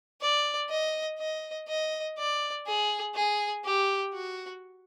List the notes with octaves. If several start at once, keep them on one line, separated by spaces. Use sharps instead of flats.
D5
D#5
D#5
D#5
D5
G#4
G#4
G4
F#4